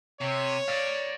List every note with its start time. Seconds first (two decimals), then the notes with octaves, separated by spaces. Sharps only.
0.21 C3 C#5
0.68 D5 F5